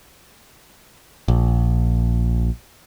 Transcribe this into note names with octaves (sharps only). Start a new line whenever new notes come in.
A#1